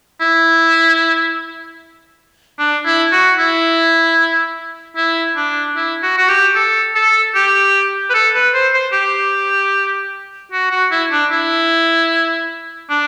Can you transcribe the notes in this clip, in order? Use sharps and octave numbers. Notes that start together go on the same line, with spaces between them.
E4
D4
E4
F#4
E4
E4
D4
E4
F#4
F#4
G4
A4
A4
G4
B4
A4
B4
C5
C5
G4
F#4
F#4
E4
D4
E4
D4